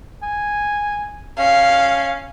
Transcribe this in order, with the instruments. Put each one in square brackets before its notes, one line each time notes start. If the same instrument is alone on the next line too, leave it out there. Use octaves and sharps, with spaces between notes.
[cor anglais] G#5
[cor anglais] C#4 [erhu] F5